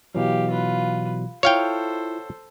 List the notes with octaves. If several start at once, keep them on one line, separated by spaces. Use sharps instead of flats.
B2 E3 F#3 G4 F5
F4 B4
E4 F4 A4 C5 C#5 F5 G5